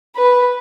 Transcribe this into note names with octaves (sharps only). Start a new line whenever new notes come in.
B4